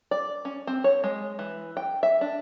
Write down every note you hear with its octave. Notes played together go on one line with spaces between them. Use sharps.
D5
C#4
C4
C#5
G#3
E3
G5
E5
D4